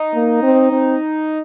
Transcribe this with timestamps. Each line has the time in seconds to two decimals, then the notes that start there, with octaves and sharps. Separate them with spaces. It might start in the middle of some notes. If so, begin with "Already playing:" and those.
Already playing: D#4
0.15 A#3
0.43 C4
0.72 C4